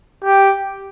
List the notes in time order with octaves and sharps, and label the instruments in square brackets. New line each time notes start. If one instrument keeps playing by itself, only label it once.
[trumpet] G4